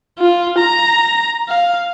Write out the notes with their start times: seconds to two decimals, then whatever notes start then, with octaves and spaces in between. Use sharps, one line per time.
0.19 F4
0.59 A#5
1.49 F5